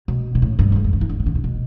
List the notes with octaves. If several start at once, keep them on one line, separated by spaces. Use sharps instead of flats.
B2
B2
A2
G2
E2
F2
E2
D3
E3
D3
C3
D3
C3
B2